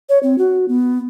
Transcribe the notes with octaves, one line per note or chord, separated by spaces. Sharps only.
C#5
C4
F#4
B3